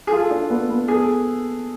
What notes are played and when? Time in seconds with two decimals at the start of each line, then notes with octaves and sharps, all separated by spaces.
0.07 G#4
0.12 F4 A4
0.31 D4
0.50 B3
0.70 B3
0.88 G#4 A4